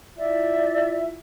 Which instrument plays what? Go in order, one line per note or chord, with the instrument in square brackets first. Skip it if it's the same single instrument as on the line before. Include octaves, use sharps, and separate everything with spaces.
[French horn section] E4 F4 [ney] D5 [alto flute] E5